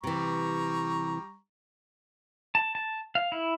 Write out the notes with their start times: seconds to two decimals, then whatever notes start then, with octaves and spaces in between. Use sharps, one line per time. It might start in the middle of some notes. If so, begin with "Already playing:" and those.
0.04 C3 E3 G3 A#5 C#6
2.55 A5
2.75 A5
3.15 F5
3.32 E4